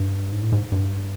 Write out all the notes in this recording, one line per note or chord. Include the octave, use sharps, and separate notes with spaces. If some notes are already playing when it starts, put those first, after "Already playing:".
Already playing: G2
G#2
A2
G#2
G2